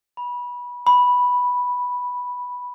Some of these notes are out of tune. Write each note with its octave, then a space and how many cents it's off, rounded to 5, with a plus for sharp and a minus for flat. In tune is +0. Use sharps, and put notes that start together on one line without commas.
B5 -20
B5 -5